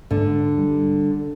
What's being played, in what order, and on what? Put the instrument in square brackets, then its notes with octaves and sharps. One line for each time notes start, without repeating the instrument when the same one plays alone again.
[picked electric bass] G#2 [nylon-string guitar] D3
[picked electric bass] G3